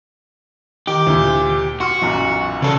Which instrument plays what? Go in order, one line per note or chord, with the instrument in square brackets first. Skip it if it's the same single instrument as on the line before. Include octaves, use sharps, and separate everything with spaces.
[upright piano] D#3 [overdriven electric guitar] G4
[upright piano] D2 A#2
[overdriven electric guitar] F#4 [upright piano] C6 F6
[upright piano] B1 F#2 A#2
[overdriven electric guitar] C#3 A4